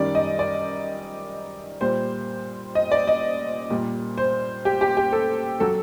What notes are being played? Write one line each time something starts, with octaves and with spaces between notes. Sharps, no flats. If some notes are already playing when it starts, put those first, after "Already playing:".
Already playing: F#2 D#3 G3 D5
D#5
D5
A#2 G3 C5
D#5
D5
D#5
A#2 G3
C5
G4
G4
G4
A4
F#3 A4